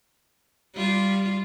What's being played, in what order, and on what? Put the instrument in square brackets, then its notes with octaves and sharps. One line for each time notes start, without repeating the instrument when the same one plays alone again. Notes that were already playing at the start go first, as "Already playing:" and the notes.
[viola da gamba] G3 F4